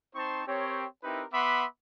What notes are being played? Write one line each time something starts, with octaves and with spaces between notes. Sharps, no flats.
C4 D#4 C5 A5 C6 C#6
C4 G4 A#4 C#5
C4 D#4 E4 G4 A#4 B4
B3 E5 F#5 B5 C6 D6